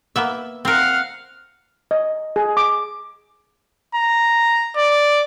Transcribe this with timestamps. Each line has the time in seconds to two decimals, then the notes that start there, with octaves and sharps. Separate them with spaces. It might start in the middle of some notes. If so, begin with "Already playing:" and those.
0.16 A#3 B3 E5
0.65 C4 A#4 F5 F#5
1.91 D#5
2.36 G#4
2.57 D6
3.95 A#5
4.77 D5